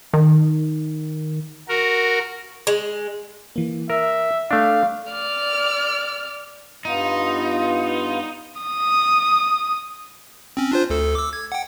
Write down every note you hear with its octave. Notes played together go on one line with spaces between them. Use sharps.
D#3
F#4 A#4
G#3
E3 A#3
A#4 E5 E6
A3 D4 F5
D5 F6
G2 B3 D#4 F4
D#6
C4 C#4
D4 F4 C5
D2 A4
D6 E6
G#6
F#5 G5